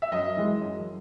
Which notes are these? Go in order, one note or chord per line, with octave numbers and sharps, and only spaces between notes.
E5
F#2 D#5
E3 G#3
F#2